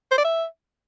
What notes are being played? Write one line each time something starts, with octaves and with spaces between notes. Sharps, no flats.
C5
D5
E5